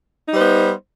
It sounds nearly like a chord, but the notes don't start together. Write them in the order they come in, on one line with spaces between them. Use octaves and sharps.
D#4 G3 C5 B3